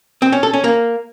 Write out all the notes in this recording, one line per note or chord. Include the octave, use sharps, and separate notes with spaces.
C4
C#4
A4
C#4
A#3